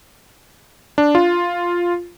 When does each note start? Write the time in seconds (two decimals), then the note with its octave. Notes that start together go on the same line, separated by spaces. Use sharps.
0.98 D4
1.15 F4